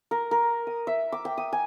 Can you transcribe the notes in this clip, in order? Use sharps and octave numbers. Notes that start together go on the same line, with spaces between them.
A#4
A#4
D#6
E5
D6
G5
D#6
G#5